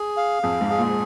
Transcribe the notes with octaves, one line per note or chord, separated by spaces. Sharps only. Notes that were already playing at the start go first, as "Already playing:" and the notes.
Already playing: G#4
F5
F2 G#4
G#2
G#4
A#2